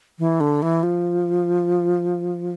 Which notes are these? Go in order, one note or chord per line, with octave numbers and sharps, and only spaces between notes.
E3
D3
E3
F3